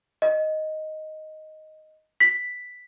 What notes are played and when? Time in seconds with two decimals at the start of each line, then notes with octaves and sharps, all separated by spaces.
0.22 D#5
2.20 B6